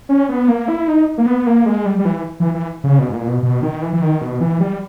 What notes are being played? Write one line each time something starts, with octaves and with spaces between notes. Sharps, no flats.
C#4
B3
A#3
E4
D#4
A#3
B3
A#3
G#3
G3
G3
E3
E3
E3
C#3
B2
G#2
A#2
B2
B2
D#3
E3
E3
D#3
B2
E3
G3